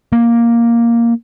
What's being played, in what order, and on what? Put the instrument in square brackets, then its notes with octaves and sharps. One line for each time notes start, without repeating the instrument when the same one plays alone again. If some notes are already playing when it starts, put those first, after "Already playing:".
[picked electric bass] A#3